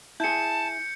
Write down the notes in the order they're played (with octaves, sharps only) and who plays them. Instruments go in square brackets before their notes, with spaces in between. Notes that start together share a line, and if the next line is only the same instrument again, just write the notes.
[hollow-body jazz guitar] E4 G#4 [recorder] A5 [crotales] G6 C#7